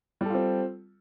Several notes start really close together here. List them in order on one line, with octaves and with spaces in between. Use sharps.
G3 A4 F4 C4